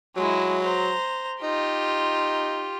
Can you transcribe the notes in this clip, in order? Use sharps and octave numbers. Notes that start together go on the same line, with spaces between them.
F#3 G#3 E4
C5 A#5
D#4 F4 G4